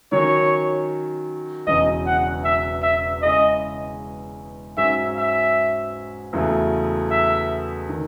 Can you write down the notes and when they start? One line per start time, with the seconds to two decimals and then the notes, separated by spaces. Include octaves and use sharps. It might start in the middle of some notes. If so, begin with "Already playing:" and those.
0.12 D#3 F#3 C#4 C#5
1.67 E1 E2 C#3 F#3 C#4 D#5
2.06 F#5
2.44 E5
2.83 E5
3.22 C#3 G#3 C#4 E4 D#5
4.77 G#2 F#3 C#4 G#4 E5
5.17 E5
6.33 E2 C#3 F#3 A3 E4
7.10 E5
7.89 D#3